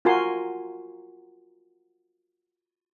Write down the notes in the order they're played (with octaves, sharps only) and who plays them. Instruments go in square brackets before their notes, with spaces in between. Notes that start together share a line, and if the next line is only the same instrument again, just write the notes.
[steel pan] F4 F#4 A#4 G#5 C6